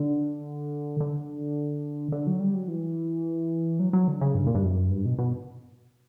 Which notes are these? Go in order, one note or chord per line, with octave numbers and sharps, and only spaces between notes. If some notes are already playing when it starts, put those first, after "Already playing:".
Already playing: D3
D3
D3
F#3
G3
F#3
E3
F#3
F#3
D3
C#3
G2
A#2
G2
F#2
G2
B2
B2